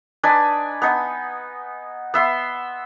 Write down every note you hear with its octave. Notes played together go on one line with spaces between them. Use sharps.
D4 D#4 B4 G#5
B3 D#4
B3 E5 C6